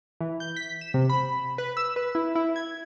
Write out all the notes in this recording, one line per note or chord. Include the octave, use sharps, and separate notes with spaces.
E3
G6
B6
E7
C3
B5
B4
E6
B4
E4
E4
G#6